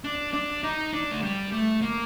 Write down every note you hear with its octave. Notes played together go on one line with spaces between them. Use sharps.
D4
D4
D#4
D4
A3
G3
A3
A#3